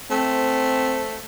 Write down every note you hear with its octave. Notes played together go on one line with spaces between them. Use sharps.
A3 C4